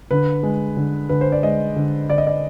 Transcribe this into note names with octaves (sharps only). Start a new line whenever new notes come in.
D3 B4
G#3
D3
D3 B4
C5
D5
G#3 D#5
D3
D3 D5
D#5
D5